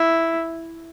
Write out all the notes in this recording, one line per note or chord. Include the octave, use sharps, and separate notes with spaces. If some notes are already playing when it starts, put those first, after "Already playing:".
Already playing: E4